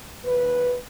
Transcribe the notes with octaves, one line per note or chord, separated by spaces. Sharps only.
D#2 B4